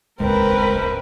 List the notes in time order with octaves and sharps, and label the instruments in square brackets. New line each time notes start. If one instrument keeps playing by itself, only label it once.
[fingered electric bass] D#1 G#1 C#2 [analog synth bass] G#3 [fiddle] C4 [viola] A#4 B4